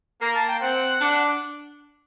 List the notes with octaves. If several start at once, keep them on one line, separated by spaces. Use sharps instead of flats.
A#3 A#5
A5
G5
C4 F#5
D4